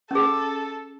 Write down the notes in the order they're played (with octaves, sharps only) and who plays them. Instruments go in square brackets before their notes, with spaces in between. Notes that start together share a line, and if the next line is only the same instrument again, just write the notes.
[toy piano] C#4 G#4 [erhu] A4